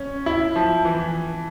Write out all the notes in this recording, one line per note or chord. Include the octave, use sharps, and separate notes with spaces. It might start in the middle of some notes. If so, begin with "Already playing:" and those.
Already playing: C#4
E4
F3
E3